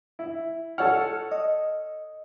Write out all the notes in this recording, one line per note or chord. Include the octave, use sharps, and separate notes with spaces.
E4
A4 C#5 F#5 F6
D#5